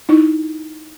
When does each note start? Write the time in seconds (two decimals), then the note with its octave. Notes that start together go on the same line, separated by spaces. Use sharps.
0.09 D#4 E4